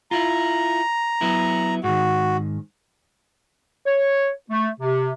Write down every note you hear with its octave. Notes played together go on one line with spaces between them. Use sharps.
E4 F4 A#5
F#3 B3 E4
G#2 D#3 F#4
C#5
A3
C3